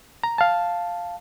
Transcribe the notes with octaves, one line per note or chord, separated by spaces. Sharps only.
A#5
F5 A5